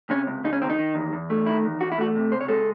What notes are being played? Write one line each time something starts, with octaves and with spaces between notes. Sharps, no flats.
C3 C#4
C#2
C#2 D#4
C#4
D#3 C4
D#4
D#3
E2
E2
A3
D#3 E4
E2
E2 F#4
E4
A3 F#4
C3
C#2 C5
C#5
G#3 A4